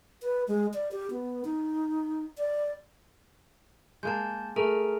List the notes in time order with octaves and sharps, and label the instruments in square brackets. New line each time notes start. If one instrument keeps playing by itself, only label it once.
[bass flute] B4
G#3
D5
G4
B3
D#4
D5
[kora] G#3 A#3 [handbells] A5 G6
[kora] A3 [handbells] G#4 A#4 A#5